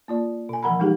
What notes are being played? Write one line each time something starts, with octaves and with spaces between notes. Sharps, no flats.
A#3 F4 D5
B2 G#5
E3 F3 A#4 F#5 A#5 B5
G3 G#3 D#4 G4 G#4